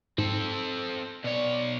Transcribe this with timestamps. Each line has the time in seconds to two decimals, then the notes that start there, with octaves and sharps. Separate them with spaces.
0.18 G#2 C4 A4
1.24 B2 C#5 D5